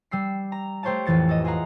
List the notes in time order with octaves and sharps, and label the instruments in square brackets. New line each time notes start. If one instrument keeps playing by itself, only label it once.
[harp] G3 E6 C7
A#5
A3 G4 C5 C#5 F5 A5
A1 F2 E3 A6 C#7
A4 D#5
F4 G#4 D#5 F5 F#5 A#5